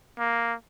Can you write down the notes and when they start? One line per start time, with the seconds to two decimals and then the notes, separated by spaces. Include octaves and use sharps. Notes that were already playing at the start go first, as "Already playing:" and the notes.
0.19 A#3